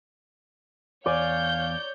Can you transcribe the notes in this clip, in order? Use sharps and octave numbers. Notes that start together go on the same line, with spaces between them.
E2 C#5 D5 F5 G#5 G6